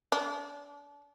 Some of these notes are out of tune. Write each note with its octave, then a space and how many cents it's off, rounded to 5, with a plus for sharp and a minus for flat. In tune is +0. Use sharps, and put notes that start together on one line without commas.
D4 -35